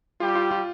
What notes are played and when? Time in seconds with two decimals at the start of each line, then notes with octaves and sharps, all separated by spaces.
0.20 G3 F4 G4
0.35 F4
0.51 F4